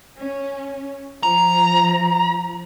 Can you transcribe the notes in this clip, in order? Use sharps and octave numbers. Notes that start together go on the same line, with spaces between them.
C#4
F3 A#5